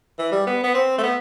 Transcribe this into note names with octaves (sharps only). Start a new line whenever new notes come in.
E3
G3
B3
B3
C4
A3
B3